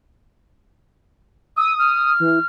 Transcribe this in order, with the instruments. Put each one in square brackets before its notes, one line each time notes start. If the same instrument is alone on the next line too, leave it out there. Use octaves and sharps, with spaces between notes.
[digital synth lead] D#6 [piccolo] E6
[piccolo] F6
[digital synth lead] E3